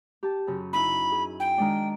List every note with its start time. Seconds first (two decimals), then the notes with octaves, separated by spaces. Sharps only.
0.23 G4 A5
0.47 F#2 C#3
0.73 D#4 E4 B5
1.12 G#4
1.40 G5 G#5
1.58 D#3 G#3 D4